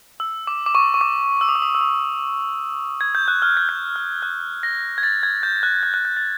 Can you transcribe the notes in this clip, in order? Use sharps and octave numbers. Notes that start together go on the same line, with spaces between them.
E6
D6
D6
C#6
C#6
D6
E6
D#6
D6
D#6
E6
D#6
G#6
G6
F#6
F6
G#6
G6
F6
F#6
A#6
G#6
A6
G#6
G6
F#6
G6
F#6
G6
A6